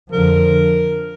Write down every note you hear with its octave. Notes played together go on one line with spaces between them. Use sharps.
F2 D3 F3 A#4